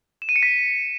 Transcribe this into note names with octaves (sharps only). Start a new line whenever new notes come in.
E7
D#7
C#7
B6